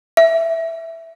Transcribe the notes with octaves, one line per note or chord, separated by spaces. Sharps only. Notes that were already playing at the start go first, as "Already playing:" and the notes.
E5